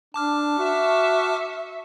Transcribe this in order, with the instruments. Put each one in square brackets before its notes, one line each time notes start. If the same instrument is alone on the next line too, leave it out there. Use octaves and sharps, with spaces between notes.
[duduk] D4 [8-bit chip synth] A5 D6 F6
[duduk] F#4 [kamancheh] E5 C#6